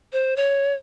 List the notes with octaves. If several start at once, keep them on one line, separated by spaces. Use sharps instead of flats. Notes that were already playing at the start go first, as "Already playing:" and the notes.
C5
C#5